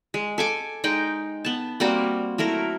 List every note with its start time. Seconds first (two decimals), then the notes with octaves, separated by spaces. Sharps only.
0.14 G#3
0.38 A4 G#5 D6
0.84 G#3 D#4 G5
1.45 B3 A5
1.80 G3 A#3 C4 F#4
2.38 F#3 A3 E4 A#4